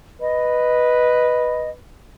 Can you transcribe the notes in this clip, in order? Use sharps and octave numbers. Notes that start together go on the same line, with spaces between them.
B4 D#5